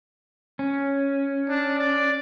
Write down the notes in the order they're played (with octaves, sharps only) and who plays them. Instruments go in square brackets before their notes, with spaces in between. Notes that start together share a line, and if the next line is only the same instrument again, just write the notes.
[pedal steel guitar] C#4
[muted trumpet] D4
D5